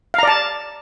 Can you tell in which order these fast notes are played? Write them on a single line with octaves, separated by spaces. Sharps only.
F5 A#5 D5 A5